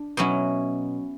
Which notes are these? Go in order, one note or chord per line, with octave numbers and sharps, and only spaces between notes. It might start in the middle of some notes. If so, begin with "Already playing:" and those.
Already playing: D4
B2 F#3 C#4 E4